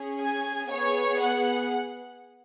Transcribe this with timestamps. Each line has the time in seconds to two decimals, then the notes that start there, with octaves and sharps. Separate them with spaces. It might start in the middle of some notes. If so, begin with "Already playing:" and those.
Already playing: C#4 G#4
0.21 G#5
0.71 B3 G#4 C#5
1.20 F#5